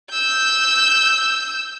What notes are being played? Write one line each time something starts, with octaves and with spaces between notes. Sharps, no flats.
E6 G6